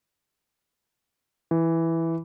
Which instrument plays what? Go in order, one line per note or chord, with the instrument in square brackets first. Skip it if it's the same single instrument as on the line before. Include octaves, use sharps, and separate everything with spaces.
[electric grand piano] E3